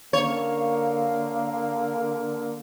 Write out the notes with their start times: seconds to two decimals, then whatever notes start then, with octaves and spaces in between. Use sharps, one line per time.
0.13 D3 A#3 C#5 F5